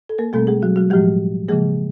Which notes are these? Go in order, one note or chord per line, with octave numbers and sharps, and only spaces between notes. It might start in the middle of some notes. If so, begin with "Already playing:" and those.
A4
A#3 A#4
B2 G3 A3 C4 A4
G#3 G#4
F#3 F#4
F#3 F#4
A2 F3 G3 G#3 G4
C#3 F3 G#3 A#3 G#4